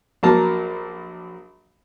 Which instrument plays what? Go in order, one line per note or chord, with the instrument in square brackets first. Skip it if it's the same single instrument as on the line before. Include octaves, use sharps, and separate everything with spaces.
[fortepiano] A#1 F#3 A#3 A5 A#5 F6